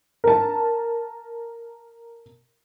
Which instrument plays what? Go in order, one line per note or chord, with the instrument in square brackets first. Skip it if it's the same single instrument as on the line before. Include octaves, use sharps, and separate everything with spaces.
[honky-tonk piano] A#4 A5